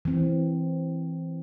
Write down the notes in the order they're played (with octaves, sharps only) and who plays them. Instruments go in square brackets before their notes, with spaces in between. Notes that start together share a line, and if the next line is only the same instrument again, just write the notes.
[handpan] E3 C4